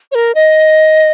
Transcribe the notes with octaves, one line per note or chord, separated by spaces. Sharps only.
C#5
A#4
D#5